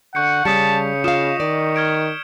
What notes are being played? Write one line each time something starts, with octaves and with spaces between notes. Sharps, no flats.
D3 F#5 C#6 G6 C#7
C#3 G3 C#4 A5 D#6 B6 C#7
F4 D#5 F5 D#6 C#7 E7
D#3 D5
F6 G#6 D7